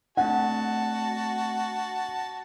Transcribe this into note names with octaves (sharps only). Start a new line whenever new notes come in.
A3 C4 D4 F#4 F#5 A5